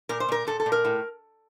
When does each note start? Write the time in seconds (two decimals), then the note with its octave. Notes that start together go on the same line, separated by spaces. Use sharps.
0.09 A#2 A#4
0.20 C5
0.29 A#2 A#4
0.47 A#2 A4
0.60 A4
0.66 A#2
0.72 A#4
0.85 A2